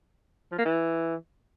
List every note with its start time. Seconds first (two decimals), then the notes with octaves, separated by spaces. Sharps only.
0.52 F3
0.59 A#3
0.65 E3